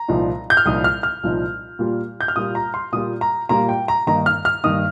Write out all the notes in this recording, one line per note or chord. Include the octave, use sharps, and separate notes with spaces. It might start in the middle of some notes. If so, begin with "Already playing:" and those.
Already playing: A#5
C2 A#2 F3 D#4
G6
F6
C2 A#2 F3 D#4 D#6
F6
F6
C2 A#2 F3 D#4
A#2 G3 A#3 F4
G6
F6
A#2 G3 A#3 F4 D#6
A#5
C6
A#2 G3 A#3 F4 D#6
A#5
A#2 G3 A#3 F4 A#5
G5
A#5
G2 D#3 A#3 D#4 A#5
F6
F6
G2 D#3 A#3 D#4 D#6